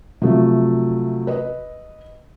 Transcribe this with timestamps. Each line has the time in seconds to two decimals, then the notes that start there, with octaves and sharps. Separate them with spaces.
0.22 C3 F3 F#3 A3
1.27 B4 D#5